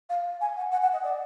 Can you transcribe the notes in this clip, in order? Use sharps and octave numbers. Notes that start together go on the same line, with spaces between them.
F5
G#5
F#5
F#5
F#5
D#5
D5